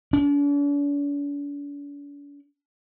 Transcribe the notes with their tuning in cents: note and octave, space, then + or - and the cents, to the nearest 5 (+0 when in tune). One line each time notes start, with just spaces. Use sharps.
D4 -45